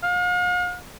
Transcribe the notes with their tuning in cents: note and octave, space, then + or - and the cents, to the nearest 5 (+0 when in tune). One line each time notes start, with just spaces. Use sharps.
F5 +45